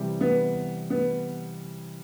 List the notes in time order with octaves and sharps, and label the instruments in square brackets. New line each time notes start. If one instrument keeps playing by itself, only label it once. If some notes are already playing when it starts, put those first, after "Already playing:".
Already playing: [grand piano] C3 E3 G3
[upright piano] B3
B3